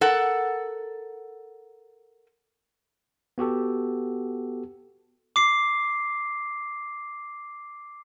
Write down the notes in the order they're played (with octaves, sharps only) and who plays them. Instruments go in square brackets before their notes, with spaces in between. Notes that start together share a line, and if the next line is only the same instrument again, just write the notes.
[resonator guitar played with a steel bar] A4 A#4 F#5
[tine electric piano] B3 F#4 G4 A4
[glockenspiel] D6 C7